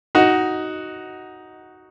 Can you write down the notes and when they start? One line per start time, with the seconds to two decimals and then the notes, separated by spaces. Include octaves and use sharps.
0.15 D#4 F#4